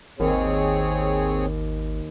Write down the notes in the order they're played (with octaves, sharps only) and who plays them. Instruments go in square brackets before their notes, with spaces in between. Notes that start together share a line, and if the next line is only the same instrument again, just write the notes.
[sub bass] G#1 [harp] D#2 [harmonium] C4 G#4 C#5